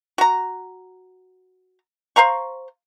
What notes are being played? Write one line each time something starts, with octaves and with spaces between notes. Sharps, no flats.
F#4 A#5
C5 F5 A#5 C#6